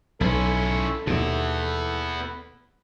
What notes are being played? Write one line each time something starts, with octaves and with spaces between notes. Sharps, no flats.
B1 C#4 E4 A4
D#2 B2 B3 E4